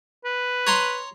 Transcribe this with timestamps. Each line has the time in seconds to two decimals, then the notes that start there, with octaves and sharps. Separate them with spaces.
0.25 B4
0.67 C#5 A#5 C6